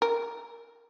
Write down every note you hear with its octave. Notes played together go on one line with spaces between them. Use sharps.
A#4